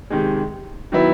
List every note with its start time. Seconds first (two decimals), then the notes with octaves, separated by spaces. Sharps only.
0.10 C3 D#3 G#3
0.92 D#3 F#3 B3 E4